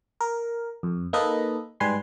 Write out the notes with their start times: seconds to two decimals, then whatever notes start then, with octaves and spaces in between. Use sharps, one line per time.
0.21 A#4
0.83 F2
1.13 A#3 D#4 A4 B4 D#5
1.80 G#2 G3 B4 G#5 C6